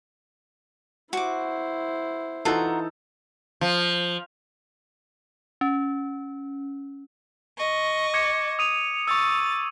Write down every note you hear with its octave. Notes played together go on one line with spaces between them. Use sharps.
E4 F#4 C5 D6
E3 D#4 F4 F#4 A4 A#5
F3
C#4
D#5 C#6
D6 G#6 C#7
D#6 D#7 F7
C#6 E6 A6